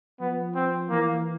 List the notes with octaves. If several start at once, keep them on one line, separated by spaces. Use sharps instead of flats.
F3 B3
C4
E3 A#3